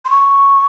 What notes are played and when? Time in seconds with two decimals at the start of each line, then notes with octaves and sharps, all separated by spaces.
0.05 C6
0.10 C#6